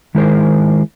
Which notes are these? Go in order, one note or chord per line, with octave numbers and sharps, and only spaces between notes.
D#3 G#3 E4 G#4 A#4 C5